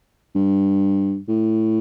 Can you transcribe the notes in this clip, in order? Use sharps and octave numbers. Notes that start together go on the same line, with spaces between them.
G2
A2